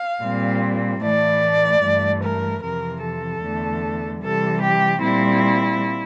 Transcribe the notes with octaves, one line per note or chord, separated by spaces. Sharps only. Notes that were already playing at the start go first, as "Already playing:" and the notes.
Already playing: F5
A#2 G3 C4
A2 E3 A3 D5
G2 E3 A3
A#4
F2 C3 E3 A#4
A4
E2 D3 A3
C3 E3 G3 A4
G4
A#2 G3 C4 E4